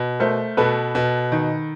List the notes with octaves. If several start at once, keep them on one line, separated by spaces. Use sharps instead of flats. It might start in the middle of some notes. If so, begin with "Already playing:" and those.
Already playing: B2
A3 A#4 C5
B2 A4 B4
B2
D#3